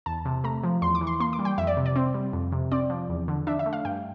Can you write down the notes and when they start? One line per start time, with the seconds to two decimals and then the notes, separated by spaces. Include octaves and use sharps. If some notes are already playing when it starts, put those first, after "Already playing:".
0.06 E2 A5
0.25 C3
0.44 A3 A#5
0.63 F3
0.82 E2 C6
0.95 D6
1.01 E3
1.07 C6
1.20 A#3 C6
1.33 D6
1.39 G3
1.45 G5
1.58 F2 E5
1.67 D5
1.77 C3
1.86 D5
1.96 C4
2.14 G3
2.33 F2
2.52 C3
2.72 C4 D5
2.90 F3
3.09 E2
3.28 D3
3.47 D4 E5
3.59 E5
3.66 A3
3.73 F5
3.85 G2 G5